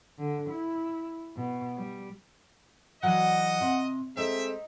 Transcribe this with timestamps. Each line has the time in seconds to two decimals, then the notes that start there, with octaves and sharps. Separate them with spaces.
0.19 D3
0.50 E4
1.36 B2
1.77 G3
3.03 E3 F#3 D5 D#5 F#5
3.61 C3
4.17 G#3 A3 C4 D#4 E5